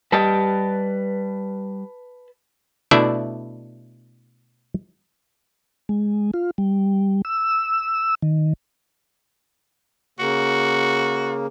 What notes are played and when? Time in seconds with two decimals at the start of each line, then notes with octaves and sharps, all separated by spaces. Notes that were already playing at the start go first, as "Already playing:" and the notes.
0.12 G3 G4 B4 D#5 A5
2.91 B2 A3 D4 E4 D5 E5
5.89 G#3
6.34 F4
6.58 G3
7.25 E6
8.22 D#3
10.19 C#3 A#3 F#4